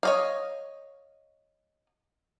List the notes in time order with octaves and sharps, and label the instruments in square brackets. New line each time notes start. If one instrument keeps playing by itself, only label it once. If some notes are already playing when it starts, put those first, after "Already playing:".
[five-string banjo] C#5 D#5 F5